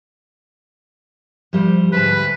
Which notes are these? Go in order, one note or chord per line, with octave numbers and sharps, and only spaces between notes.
F3 G3 C5
D2 G#2 B4 A5